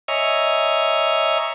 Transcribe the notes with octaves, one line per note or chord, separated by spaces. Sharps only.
C#5 D#5 E5 G#5 A#5 C#6